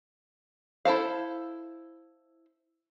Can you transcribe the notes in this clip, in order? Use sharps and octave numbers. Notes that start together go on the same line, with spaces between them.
E4 A4 C5 F5